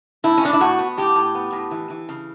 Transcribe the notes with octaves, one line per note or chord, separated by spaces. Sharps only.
A2 E4
C#4
A2 D4
E4
A2 F#4
B3
A2 G4
A2
B3
A2
E3
E3
C#3